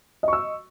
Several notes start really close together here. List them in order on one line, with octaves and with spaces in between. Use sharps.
D#5 C#6 E6